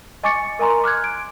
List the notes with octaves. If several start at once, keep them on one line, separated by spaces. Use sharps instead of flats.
D#5 G#5 C#6 D6 A6 C#7
A#4 D#5 G#5 A#5 C6
D6 F6 F#6 G#6
D7